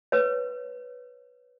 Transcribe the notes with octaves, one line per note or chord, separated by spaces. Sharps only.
B4 C#5